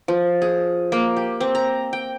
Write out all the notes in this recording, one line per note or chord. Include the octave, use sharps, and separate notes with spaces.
F3
G#4
A#3
G4
C4
A#5
G5